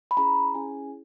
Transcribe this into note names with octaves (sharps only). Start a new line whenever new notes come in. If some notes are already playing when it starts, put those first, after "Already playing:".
B5
C#4 E4 G#4 A#5
C#4 E4 G#4 G#5